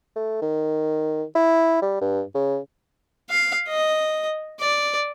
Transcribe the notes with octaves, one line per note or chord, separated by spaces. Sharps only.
A3
D#3
E4
G3
G2
C#3
F5
D#5
D5